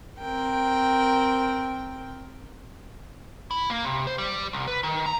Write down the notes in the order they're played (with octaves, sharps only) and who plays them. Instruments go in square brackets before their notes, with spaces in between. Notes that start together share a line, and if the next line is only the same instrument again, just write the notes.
[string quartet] C4 A#4 G5
[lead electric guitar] E4
A#3
C3
C5
G3
C2
B4
D#3
A#5